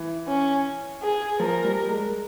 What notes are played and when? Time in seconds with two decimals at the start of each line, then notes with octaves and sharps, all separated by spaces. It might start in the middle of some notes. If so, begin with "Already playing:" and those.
Already playing: E3
0.28 C#4
1.03 G#4
1.40 F3 A#4
1.64 G3
1.89 G#3